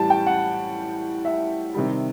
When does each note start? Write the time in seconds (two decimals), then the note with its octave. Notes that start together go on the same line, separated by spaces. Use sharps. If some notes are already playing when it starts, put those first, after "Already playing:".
Already playing: A2 E3 G3 A5
0.10 G5
0.27 F#5
1.25 E5
1.74 C3 D#3 G3